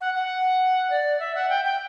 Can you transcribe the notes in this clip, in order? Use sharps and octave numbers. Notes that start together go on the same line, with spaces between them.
F#5
F#5
D5
E5
F#5
G5
G5